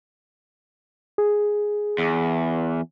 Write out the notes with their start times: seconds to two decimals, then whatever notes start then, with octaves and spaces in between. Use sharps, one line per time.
1.18 G#4
1.98 E2